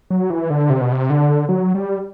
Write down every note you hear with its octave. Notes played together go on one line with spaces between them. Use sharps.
F#3
E3
D3
C3
B2
C3
D3
F#3
G3